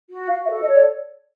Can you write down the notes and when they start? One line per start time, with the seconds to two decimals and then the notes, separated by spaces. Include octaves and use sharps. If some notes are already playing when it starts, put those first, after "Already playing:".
0.10 F#4
0.30 F#4 F5
0.45 E5
0.49 A4
0.59 D#5
0.68 C#5
0.74 D5